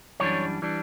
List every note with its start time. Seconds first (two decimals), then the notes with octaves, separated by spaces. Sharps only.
0.20 F#2 E3 G3 D4 C#5
0.62 E3 G3 D4